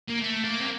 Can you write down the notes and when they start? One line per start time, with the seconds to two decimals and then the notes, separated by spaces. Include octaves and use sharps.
0.08 A#3
0.20 A3
0.44 A#3
0.60 C4